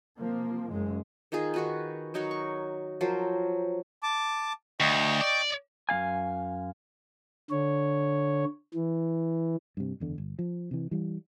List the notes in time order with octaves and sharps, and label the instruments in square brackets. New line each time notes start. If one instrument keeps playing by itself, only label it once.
[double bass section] C3 F3 A#3
F#1 F#2 G#3
[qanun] D#3 D#4 F4 G#4
D#3 F#4 B4
F#3 D#4 F#4 C#5
C#6
F3 F#3 A#4 C5
[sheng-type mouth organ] A5 D6
[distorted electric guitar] D2 [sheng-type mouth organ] D#5 G5 C#6
[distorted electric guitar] D5
[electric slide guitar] F#2 B3 F5 G#5
[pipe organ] D3 C#5
E3
[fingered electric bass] G2 C3
F#1 E2 D3
G1
F3
C3 E3
E3 G3